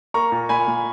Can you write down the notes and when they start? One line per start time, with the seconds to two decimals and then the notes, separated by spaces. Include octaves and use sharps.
0.14 A#3 A#5 C#6
0.32 A#2
0.49 A#2 G#5 B5
0.68 A#2